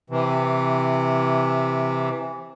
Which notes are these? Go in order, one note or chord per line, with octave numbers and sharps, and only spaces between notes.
C3 E3